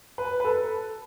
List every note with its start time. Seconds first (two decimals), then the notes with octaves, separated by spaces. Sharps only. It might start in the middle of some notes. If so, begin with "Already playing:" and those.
0.18 B4
0.40 B4
0.45 A4